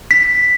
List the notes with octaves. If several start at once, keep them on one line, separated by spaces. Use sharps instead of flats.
B6